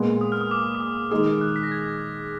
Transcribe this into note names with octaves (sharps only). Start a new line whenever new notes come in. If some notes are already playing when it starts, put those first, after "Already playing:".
Already playing: A#2 G#3 B3
D#6
F6
D#6
D6
D6
D#6
D#3 G#3 D#4 G#4 D#6
F#6
B6
A#6
G#6